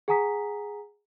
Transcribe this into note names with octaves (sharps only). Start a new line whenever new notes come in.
G#4 F#5 G#5 A#5 D#6 B6